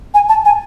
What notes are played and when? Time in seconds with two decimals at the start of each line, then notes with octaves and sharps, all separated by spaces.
0.14 G#5
0.29 A5
0.45 G#5